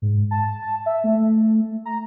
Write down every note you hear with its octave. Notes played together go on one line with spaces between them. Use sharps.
G#2
A5
E5
A3
A#5